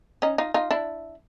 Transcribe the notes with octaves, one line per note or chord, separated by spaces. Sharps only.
C#4 D#4
D#4 F4
D#4 F4
D4 E4